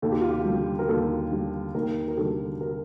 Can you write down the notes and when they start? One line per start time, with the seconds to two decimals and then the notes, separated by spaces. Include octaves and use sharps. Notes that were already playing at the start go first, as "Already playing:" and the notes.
0.02 D#2 A4
0.12 G4
0.21 F4
0.30 G4
0.45 D3 G3
0.79 A#4
0.89 D#2 A4
1.31 D3 G3
1.74 D#2 A#4
2.08 A#4
2.17 D3 G3 A4
2.61 A#4